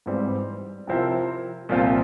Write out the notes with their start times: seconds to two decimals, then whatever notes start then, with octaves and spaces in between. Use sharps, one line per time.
0.06 G#2 E3 G3 C4 G4
0.87 C3 F3 C4 E4 A#4
1.69 C2 A#2 F3 C4 F4